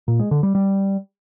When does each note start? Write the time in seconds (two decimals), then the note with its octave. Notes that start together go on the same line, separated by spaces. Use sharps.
0.08 A#2
0.20 G#3
0.31 D3
0.43 G3
0.55 G3